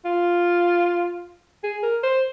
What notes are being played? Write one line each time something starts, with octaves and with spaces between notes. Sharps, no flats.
F4
G#4
A#4
C5